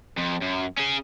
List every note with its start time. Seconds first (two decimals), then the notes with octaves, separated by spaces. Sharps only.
0.17 F2
0.41 F#2
0.77 C#4 G#4